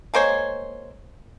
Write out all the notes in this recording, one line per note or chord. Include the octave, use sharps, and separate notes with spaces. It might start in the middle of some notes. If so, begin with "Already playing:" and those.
G#3 A#3 C5 C#5